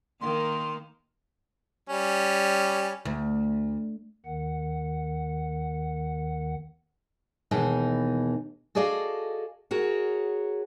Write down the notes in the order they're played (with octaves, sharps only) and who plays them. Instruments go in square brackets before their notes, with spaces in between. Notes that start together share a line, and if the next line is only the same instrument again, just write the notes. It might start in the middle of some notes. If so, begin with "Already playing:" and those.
[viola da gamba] D#3 A#3 [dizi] C6
[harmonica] G3 C#4
[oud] D2
[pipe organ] D#2 D#3 F#5
[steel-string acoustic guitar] D#2 B2 E3 G#3 D#4
F#4 G#4 A4 D5 D#5 F5
F#4 G#4 A#4 C#5